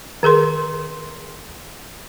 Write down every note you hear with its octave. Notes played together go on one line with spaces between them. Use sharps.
D#3 G#4 A#4 C6